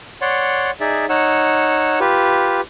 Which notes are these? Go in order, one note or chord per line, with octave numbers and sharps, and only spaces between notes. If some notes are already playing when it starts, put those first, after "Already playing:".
C#5 D5 F#5 C6
D#4 G#4 D5 E5
D#4 C#5 F#5 E6
F4 G4 B4